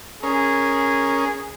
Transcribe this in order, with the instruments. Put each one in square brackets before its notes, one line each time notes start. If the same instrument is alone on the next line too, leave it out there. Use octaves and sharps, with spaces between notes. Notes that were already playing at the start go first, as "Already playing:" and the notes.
[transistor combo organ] C#4 A#4 [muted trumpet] G#4